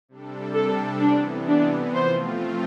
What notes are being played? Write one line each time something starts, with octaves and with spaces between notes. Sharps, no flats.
C3 G3 D4 A4
A4
C3 E3 B3 D4
D4
F3 A3 C4 F4 C5